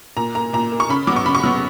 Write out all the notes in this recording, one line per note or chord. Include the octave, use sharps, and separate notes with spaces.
A#2 A#5
A#3 A#5
A#2 A#5
A#3
C#6
C#3 B5
F#3 D6
B3 C#6
C#3 B5
C#6
F#3 B3